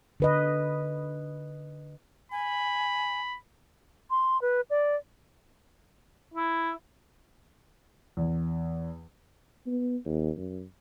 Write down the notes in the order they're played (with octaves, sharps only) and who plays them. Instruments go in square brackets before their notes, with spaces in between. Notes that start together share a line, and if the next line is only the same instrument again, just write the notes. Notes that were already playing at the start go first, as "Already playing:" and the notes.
[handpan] D3 B4 D#5
[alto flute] G#5 [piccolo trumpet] B5
[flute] C6
B4
D5
[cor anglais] E4
[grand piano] E2
[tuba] B3
D#2
F#2